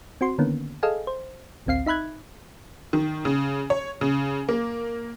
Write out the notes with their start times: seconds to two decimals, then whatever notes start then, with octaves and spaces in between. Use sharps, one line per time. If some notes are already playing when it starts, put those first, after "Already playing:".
0.21 C4 F#4 C6
0.38 D3 D#3 A#3 B3 C#4
0.83 G#4 A4 D#5 F5 G#5
1.07 C5
1.66 A1 D2 C4 F5 C7
1.86 D#4 E5 B5 F#6 G#6
2.93 D#3
3.25 C#3
3.70 C#5
4.01 C#3
4.49 A#3